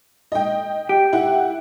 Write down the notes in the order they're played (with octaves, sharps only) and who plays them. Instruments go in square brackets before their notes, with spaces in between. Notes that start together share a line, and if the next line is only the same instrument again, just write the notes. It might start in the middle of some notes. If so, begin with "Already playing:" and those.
[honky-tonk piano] D#5 G5
[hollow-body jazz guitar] G4
[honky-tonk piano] E4 F#5